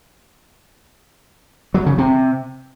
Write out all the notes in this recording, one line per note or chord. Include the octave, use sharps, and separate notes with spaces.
F#3
C#3
C3